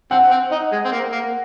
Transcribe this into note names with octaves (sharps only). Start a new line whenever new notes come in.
C4 F#5
C4
D#4
G#3
C4
A#3
A#3